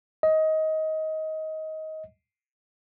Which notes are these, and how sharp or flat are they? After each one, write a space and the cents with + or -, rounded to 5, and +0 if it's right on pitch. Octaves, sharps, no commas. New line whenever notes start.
D#5 +20